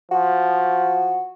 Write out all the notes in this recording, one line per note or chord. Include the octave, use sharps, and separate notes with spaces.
F3 F#4